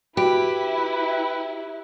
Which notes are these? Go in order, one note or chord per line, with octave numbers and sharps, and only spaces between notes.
E4 F#4 G4 B4 D7